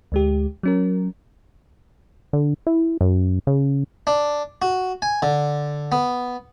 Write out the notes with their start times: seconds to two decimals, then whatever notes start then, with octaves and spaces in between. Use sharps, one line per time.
0.12 D2 G#3 G4
0.63 F#3 C#4 A#4
2.33 D3
2.67 E4
3.01 F#2
3.47 C#3
4.07 D4
4.62 F#4
5.02 G#5
5.22 D3
5.92 B3